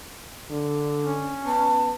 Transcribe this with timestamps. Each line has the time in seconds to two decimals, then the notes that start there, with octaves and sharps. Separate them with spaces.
0.50 D3
1.03 C#4
1.46 B3 A5